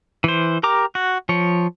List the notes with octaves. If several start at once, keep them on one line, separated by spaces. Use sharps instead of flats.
E3 C5
G4 A#4 A#5 D6
F#4
F3 C#5